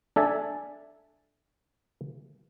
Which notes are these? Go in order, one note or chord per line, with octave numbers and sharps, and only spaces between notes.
D4 A4 E5 G#5 A5